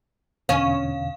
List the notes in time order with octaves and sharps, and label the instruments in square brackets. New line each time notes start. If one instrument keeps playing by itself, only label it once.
[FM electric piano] E2 B2 D3 [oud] C#4 [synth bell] F5